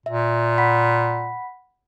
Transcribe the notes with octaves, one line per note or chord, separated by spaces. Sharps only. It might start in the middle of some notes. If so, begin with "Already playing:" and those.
A#2 E5
F#5 B5 B6